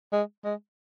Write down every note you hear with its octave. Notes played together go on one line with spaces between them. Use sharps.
G#3
G#3